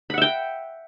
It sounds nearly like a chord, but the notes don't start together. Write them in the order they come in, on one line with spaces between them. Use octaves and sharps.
B5 F#5 E5 G5